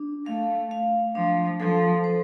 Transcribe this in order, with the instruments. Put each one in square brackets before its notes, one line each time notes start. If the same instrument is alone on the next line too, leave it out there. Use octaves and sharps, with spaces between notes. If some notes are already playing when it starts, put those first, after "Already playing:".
Already playing: [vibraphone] D4
[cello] A3 [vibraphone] F5
[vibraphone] F5
[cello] F3 [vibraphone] D4
[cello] F3 [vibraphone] A4
[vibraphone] C5